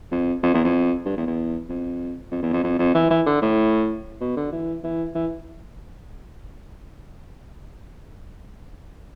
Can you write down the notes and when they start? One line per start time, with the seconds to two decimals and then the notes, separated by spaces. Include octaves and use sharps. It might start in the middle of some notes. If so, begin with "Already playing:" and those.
0.12 F2
0.43 F2
0.54 E2
0.64 F2
1.06 G2
1.17 E2
1.27 E2
1.69 F2
2.32 F2
2.42 E2
2.53 F2
2.64 F2
2.79 F2
2.95 E3
3.10 E3
3.26 D3
3.42 A2
4.21 B2
4.36 D3
4.52 E3
4.84 E3
5.15 E3